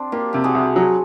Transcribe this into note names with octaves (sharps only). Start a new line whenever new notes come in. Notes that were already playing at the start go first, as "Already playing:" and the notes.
Already playing: C4 D4
A#3 F4 G4
C3 G4
F#4 G#4
C2
F#3